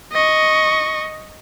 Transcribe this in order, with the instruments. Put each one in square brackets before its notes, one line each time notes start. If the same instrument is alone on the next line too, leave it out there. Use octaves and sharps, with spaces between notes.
[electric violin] D#5 C#6